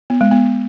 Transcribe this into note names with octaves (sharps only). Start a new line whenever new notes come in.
B3
G#3
B3